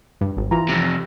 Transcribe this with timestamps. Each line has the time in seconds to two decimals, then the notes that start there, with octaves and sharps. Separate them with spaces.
0.21 G2
0.37 G#1
0.51 E3 F4 A#5
0.69 F2 C3